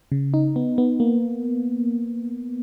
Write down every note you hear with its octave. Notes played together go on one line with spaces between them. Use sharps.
C#3
D#4
B3
B3
A#3